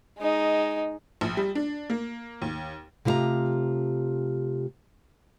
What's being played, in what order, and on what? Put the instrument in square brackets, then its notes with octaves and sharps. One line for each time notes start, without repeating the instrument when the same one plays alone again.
[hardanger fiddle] G#3 D#4
[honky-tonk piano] A#1
G3
D4
A#3
D#2
[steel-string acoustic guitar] C3 A3 E4 F4 G4 A#5